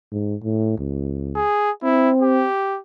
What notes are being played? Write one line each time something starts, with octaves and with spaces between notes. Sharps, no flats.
G#2
A2
C#2
G#4
C4 E4
G4